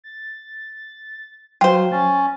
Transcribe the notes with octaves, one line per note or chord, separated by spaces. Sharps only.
A6
F#3 F4 C5 G5
C#4 A6